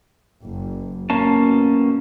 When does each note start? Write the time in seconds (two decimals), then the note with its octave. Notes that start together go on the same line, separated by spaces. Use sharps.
0.44 F#1
1.10 B2 A#3 C#4 A5